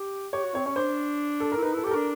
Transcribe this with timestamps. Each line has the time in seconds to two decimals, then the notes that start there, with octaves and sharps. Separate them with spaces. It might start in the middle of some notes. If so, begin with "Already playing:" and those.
Already playing: G4
0.33 G4 C#5
0.44 F#4
0.54 C4 C#5
0.66 C#4 C#5
0.76 D4 C5
1.40 A4
1.52 A#4
1.57 E4
1.62 D#4 B4
1.73 E4 A4
1.84 G4 A4
1.91 D4 A#4